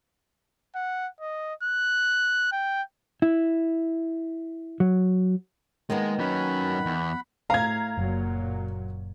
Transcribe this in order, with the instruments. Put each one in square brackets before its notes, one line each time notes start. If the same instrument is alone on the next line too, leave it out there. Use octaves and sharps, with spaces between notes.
[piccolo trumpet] F#5
D#5
F#6
G5
[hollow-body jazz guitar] E4
F#3
[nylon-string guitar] D#3 A#3 B3 [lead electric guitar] G#3
[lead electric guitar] F#3 C#4 [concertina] F#5 B5
[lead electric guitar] E2
[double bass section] A2 [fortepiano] F5 [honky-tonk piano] A#5 G#6
[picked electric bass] F#1 [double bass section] A#2 F#3 A#3